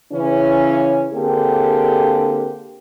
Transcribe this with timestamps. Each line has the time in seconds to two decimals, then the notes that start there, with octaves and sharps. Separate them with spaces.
0.13 C#3 E3 C#4
1.12 D3 A#3 C4 D4 G4 G#4